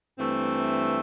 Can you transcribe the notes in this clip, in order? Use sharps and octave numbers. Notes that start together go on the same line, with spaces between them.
G2 E3 A3 C4